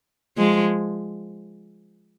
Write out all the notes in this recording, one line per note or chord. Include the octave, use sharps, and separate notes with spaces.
F3 G#3